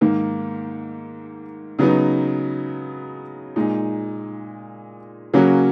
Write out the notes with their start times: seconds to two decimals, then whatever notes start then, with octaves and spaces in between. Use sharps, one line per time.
0.01 G#2 D#3 A#3
1.79 C#3 F#3 B3 D#4
3.56 A#2 G#3 D#4
5.33 C#3 F#3 A#3 C#4 F#4